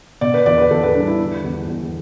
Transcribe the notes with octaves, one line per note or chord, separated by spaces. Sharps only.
B2 D5
B4
E2 D5
B4
E2 A4
B4
G3 D4
E4
D3
E2
E2